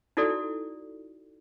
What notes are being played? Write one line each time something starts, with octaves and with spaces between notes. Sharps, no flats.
D#4 E4 F#4 A4 D5